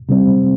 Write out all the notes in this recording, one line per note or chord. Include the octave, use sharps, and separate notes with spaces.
C3 G3 C4